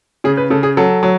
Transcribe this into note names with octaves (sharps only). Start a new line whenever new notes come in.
C#3 G#4
B4
C#3 A4
G#4
F#3 A4
F#3